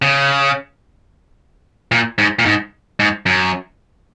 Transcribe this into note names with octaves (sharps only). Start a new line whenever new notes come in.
C#3
A#2
G#2
A#2
G#2
G#2
F#2